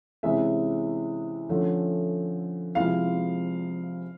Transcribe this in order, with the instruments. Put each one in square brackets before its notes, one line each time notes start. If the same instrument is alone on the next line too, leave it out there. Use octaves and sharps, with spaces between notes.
[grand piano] C3 E3 G#3 C#4 [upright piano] E5
[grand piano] D3 F3 A3 C#4
[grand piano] C3 F3 G#3 C4 E4 [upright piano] F5